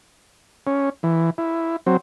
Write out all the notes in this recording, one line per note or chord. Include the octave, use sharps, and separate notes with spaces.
C#4
E3
E4
F#3 C4